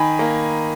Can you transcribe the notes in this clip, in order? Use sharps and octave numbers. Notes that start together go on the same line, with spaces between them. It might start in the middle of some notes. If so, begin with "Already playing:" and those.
Already playing: D#3 G#5 B5
A#3